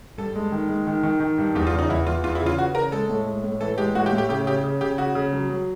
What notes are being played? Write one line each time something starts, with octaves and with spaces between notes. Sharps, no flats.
G2 A4
G#3
D#3
G#3
D#3
D#3
D#3
G2
E2 G4
F4
C#3
D#4
E2 E4
E2 F4
E2 F4
E4
C#3
F4
E3 F#4
C#3 A#4
G#3 A4
A2
G#3
A2
E3 A4
G#3 G4
A2 F#4
G4
A2
G4
C#3 G4
C#3 G4
C#3
C#3 G4
C#3 F#4
C#3
F#3
F#3